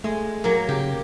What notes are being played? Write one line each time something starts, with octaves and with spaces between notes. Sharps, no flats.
G#3 A3
F#3 A#3
C#3 G4